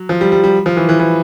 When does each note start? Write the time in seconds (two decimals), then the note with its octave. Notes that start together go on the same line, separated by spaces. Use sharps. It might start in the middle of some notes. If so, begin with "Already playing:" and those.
Already playing: F#3
0.09 F3
0.21 G3
0.32 G3
0.44 G3
0.66 F3
0.77 E3
0.89 E3
1.00 E3